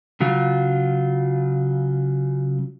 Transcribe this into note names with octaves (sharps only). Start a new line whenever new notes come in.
C#3 F#3 F4